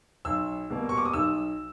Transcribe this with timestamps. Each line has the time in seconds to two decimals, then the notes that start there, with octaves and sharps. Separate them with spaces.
0.25 B1 E6
0.70 B2 G3 A#3
0.89 C#6
0.97 D6
1.05 D#6
1.13 B1 E6